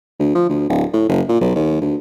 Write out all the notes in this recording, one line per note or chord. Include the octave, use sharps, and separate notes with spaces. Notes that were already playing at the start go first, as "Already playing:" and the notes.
D2
F3
D2
D1
A2
F#1
A#2
B1
D#2
D2